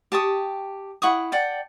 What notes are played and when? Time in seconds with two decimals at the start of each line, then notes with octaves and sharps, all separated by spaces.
0.12 G4 A5 C#6 D#6
1.02 E4 F#5 C#6 D#6
1.32 D5 F#5 G5 A5